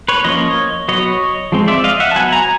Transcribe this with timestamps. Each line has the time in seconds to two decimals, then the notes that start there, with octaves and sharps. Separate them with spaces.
0.08 B4 C#5
0.24 F3 A#3 C#4 C#5 D#5
0.88 F#3 B3 C#5 D#5
1.52 F3 G#3 C4
1.68 D5 E5
1.84 D#5 F5
2.00 E5 F#5
2.11 A5
2.16 F#3 B3 F#5 G#5
2.32 G#5 A#5